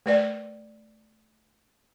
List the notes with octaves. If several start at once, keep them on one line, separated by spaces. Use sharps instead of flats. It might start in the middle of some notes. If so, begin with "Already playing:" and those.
A3 B4 D5